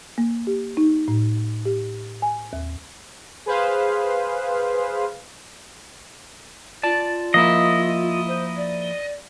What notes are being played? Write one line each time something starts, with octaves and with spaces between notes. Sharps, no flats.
A#3
G4
D#4
A2
G4
G#5
D#2
G#4 B4 C5 F5
F4 D5 A5
F3 A#3 E4 D#5
C5
D5